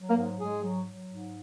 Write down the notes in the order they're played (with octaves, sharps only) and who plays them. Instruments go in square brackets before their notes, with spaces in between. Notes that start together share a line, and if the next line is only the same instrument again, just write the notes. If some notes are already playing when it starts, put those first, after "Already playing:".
Already playing: [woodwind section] F#3
A#3 A#4
G#2
G#2 G#3 G#4
F#3
F#3
G#2